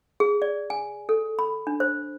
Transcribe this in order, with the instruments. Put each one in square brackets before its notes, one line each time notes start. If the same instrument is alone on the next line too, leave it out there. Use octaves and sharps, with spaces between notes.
[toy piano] G#4
D5
G#5
A4
B5
D4
C5